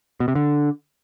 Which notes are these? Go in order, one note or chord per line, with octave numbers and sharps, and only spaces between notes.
B2
C3
D3